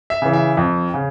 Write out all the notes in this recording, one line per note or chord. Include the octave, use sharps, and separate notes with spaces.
E5
C#3 E3
E5
F2
C#3